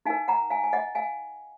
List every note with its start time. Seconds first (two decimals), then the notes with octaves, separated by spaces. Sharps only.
0.05 D#4 A#4 F5 G#5
0.28 F#5 A#5
0.50 F5 G#5
0.64 G#5
0.73 D#5 F#5
0.95 F5 G#5